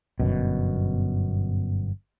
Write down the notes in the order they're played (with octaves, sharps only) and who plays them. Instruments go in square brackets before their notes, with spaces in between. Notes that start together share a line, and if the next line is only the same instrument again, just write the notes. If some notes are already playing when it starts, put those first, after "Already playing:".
[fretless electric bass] G1 F#2 B2